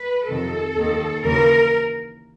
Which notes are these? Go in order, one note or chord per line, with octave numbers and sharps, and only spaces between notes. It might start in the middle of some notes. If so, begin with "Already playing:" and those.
Already playing: B4
F2 C3 D#3 A4
D#2 D#3
D#2 C#3 E3 A#4